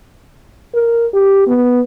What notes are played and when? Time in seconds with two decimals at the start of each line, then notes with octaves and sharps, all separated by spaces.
0.74 A#4
1.14 G4
1.47 B3